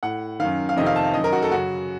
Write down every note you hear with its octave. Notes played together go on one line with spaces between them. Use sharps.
A2 F#5
F#2 D#3 F5
F5
F2 C3 D#3 D#5
F5
A5
F5
F#2 D#3 D#5
A#4
F#4
A4
F#2 C#3 F#4